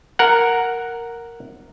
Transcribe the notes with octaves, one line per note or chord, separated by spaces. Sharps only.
A#4 F#5